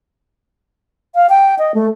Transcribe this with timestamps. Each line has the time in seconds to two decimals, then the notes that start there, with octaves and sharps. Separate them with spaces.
1.15 F5
1.29 G5
1.59 D#5
1.74 A3